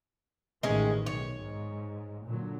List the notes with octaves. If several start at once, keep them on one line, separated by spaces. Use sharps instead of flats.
A1 D#3 G#3 C#4
B1 C#5
G#2
A#2 D3 F#3